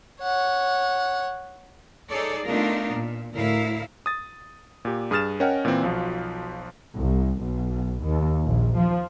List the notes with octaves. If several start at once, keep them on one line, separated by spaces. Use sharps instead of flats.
C#5 F#5
D#4 G#4 A4 C#5 D5
A3 B3 D4 D#4 F4 A#4
A#2
D2 A2 E4 A#4 F5
D#6 A6
A#2 G4
G2 G#4 D#6 F6 A6 E7
C#4 A#4 C#5 D#5 F#5 G5
A#2 E3 C4
B1 F3 F4 F#4
C2
B1
D#2
A#1
F3